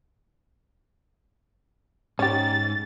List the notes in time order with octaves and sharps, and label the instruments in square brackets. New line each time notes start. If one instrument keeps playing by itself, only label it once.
[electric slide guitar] G#2 [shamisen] C#4 G4 [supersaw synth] A6